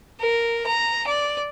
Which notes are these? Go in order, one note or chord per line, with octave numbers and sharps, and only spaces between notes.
A#4
A#5
D5